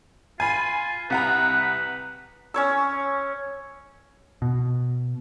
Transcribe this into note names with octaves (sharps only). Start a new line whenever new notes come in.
F4 G#5 B5
C2 B4 F#5 A#5
C#4 C#5 E6
B2